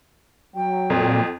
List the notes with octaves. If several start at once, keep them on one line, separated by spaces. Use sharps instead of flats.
F#3 G5
F2 A#2